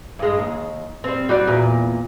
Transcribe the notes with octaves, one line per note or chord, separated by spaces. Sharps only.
G2 G#3
D#2
G3 C4
G3 F#4 D5
E2 A#2